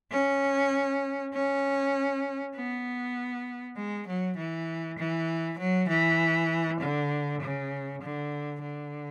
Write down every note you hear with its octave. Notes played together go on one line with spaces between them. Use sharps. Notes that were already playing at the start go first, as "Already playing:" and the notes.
C#4
C#4
B3
G#3
F#3
E3
E3
F#3
E3
D3
C#3
D3
D3